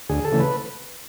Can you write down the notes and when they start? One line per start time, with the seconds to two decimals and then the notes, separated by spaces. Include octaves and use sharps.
0.09 D2 G#4
0.25 A4
0.32 C#3 E3 A3
0.40 B4